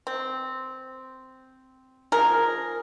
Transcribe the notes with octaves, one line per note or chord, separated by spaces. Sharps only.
C4
F3 G#4 A#4